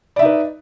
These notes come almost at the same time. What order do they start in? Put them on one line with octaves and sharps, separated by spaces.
D5 E5 D#4 B4